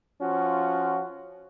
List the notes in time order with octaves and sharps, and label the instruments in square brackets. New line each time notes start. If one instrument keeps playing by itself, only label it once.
[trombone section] F3 C#4 F4 F#4